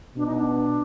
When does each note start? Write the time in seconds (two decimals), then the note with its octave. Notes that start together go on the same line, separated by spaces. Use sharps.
0.16 B2 D4
0.27 D#4
0.36 D4